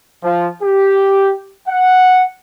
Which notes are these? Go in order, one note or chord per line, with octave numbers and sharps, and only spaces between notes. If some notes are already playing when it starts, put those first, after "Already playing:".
F3
G4
F#5